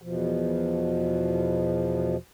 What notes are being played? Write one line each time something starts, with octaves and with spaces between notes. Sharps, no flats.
E2 B2 F3